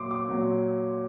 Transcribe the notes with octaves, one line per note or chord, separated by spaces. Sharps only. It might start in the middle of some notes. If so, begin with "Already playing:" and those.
Already playing: A#2 F#3 C6 D6
D6
A#2 F#3